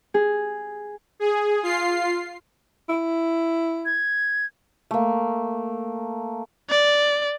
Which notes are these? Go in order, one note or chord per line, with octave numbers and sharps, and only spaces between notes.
G#4
G#4
F4 C7
E4
G#6
A3 A#3
D5